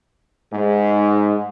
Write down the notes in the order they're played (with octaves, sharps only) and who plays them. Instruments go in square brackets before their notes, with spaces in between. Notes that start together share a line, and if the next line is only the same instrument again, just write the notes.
[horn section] G#2